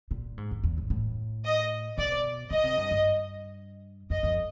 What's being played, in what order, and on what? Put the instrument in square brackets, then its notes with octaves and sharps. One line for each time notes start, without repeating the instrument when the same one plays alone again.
[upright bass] A#2
G#2
E2
E2
A2
A2
[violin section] D#5
[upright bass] B2 [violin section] D5
[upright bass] C#3 [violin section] D#5
[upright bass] C3
G2
G2
[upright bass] F2 [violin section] D#5
[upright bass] F2